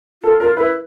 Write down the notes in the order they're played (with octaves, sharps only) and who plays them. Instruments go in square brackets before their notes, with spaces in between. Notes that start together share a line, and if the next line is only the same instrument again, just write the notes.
[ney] F4 [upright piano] A4
[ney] F4 [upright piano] A#4
[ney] E4 [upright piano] B4